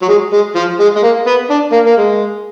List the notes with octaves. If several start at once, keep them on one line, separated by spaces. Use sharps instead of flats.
F#3
G#3
G#3
F3
G#3
G#3
A#3
B3
D4
A#3
A#3
G#3